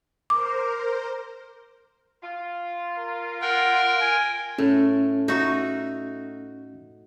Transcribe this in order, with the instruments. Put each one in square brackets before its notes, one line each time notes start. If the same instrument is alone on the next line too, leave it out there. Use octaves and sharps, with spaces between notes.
[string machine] A#4 C5 [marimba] D6
[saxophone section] F4
[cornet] A#4
[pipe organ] A#4 G5 [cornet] F#5
[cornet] G#5
[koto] A2 [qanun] A3 [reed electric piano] C#4
[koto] D#4 F#4 [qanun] E5